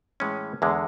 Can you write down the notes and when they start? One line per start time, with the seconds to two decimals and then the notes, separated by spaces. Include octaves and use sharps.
0.20 A2 E3 G#3 C#4
0.62 E2 D3 G#3